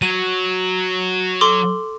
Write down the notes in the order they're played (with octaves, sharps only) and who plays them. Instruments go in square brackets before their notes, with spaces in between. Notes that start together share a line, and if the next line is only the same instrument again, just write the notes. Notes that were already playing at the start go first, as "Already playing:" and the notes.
[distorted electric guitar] F#3 [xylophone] D#7
[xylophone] A4 C6 D6